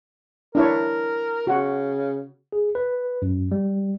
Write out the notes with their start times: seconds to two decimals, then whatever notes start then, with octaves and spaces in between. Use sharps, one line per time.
0.55 D4 E4 A#4 C#5
1.47 C#3 F#4 F#5
2.52 G#4
2.75 B4
3.22 F#2
3.52 G3